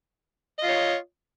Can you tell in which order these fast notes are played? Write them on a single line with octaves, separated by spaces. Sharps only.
D#5 F4 C#5